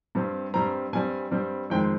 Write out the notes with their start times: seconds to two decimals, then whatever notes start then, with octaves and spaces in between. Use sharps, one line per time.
0.15 G2 G3 C4
0.54 G2 G3 C4 A#5
0.93 G2 G3 C4 G#5
1.31 G2 G3 C4
1.70 F2 D#3 G#3 C4 G5